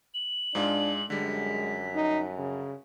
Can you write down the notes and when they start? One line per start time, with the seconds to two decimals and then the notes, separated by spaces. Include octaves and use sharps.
0.14 F#7
0.55 G#2 G#3 D4 F4
1.10 F#2 D3 G3 G#3 B6
1.95 D#4
2.38 C#3